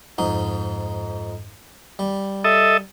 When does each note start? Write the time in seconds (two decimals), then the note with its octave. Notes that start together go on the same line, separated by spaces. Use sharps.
0.18 F2 G#2 D#4
1.99 G3
2.44 A4 D#5 E5